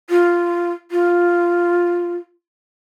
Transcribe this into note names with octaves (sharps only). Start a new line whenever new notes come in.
F4
F4